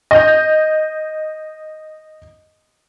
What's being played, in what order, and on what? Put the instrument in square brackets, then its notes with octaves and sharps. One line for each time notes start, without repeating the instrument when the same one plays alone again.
[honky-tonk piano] D#5 G6